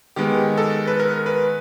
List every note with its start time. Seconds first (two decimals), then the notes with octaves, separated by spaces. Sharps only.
0.16 D#3 G#3 B3 G4
0.58 A4
0.87 B4
1.00 A#4
1.26 B4